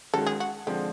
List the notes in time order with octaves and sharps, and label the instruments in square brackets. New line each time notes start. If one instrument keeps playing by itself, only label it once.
[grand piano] D#3 G#3 C#4 F#4 [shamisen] A4
[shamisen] G#4
F#4
[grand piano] D3 F3 G#3 C4 [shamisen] G4